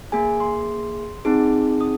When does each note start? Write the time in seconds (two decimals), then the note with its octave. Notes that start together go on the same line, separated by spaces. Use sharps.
0.12 A#3 G#4 G#5
0.40 C6
1.25 C4 D#4 G#4
1.81 D#6